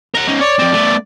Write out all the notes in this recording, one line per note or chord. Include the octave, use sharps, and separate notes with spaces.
A#4 F#5
C#4 D#4
C#5 D5
F2 C4
A3 B3